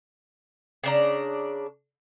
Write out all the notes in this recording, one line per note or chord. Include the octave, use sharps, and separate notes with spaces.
C#3 D4 A#5